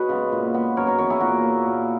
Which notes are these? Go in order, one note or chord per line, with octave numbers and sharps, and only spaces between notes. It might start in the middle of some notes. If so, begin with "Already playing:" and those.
Already playing: F#4 G#4 B4 C#5 D#5
C#3 G#3 B3
A#2
G#3 B3
F#2 A#4 C#5
A#4 C#5
E3 B3 A#4 C#5
E4 G#4
A#2 F#4 A#4
A#3
A#2